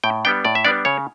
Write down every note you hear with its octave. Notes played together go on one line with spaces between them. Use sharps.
A2 G5
G3 B3 D4 G5
A2 D5
E5
G3 B3 D4 D5
C#3 C#5